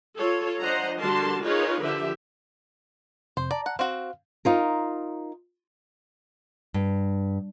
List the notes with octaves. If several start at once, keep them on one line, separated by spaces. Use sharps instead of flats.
F4 A4 C#5
F3 D4 C5 D#5 F#5 A#5
D3 G3 F#4 A#4 A5 C6
D#4 F4 G#4 A#4 B4 C#5
D3 F3 G4 E5
F2 C3 C5
D5 A5 A#5
F#5
C4 F#4 F5
D#4 F4 A#4
G2